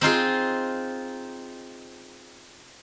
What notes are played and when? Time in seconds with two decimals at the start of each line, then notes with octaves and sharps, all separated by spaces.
0.01 C4 D#4 F4 G#4